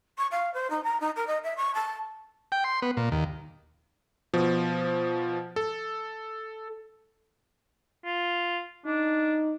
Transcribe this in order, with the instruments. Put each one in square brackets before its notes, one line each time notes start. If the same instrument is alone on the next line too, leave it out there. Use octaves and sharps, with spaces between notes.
[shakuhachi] C#6
F5
C5
D#4
A#5
D#4
A#4
D#5
E5
C#6
A5
[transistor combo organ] G5
C6
B3
A#2
D#2
[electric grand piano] B2 F3
A4
[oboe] F4
[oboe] D4 [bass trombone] D#4